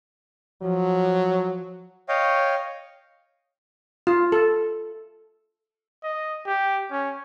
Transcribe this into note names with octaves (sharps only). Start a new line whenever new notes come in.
F3 F#3
C#5 D#5 F5 G5
F4
A4
D#5
G4
C#4